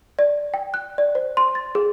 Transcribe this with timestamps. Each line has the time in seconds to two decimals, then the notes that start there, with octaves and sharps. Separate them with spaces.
0.19 D5
0.54 G5
0.74 F#6
0.98 D5
1.15 C5
1.37 C6
1.55 A6
1.75 G#4